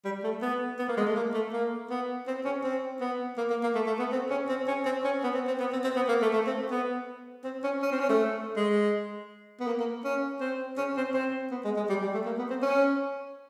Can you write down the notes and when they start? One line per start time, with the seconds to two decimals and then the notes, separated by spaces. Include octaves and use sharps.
0.05 G3
0.24 A3
0.42 B3
0.79 B3
0.89 A#3
0.97 G#3
1.07 A3
1.16 A#3
1.34 A3
1.53 A#3
1.90 B3
2.28 C4
2.45 C#4
2.64 C4
3.01 B3
3.38 A#3
3.50 A#3
3.63 A#3
3.75 A3
3.87 A3
3.99 B3
4.12 C4
4.31 C#4
4.49 C4
4.68 C#4
4.85 C4
5.04 C#4
5.24 B3
5.35 C4
5.47 C4
5.60 B3
5.73 C4
5.84 C4
5.96 B3
6.09 A#3
6.22 A3
6.33 A3
6.47 C4
6.71 B3
7.44 C4
7.64 C#4
7.83 C#4
7.92 C4
8.00 C#4
8.09 A3
8.56 G#3
9.60 B3
9.67 A#3
9.80 A#3
10.05 C#4
10.41 C4
10.78 C#4
10.97 C4
11.14 C4
11.51 B3
11.65 G#3
11.77 G#3
11.89 G3
12.02 G3
12.14 A3
12.26 A#3
12.39 B3
12.50 C4
12.62 C#4